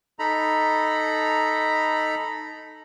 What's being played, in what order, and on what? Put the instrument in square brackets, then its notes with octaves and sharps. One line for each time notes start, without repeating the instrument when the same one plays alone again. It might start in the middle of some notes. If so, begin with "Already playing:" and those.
[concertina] D#4 A4 A#5 B5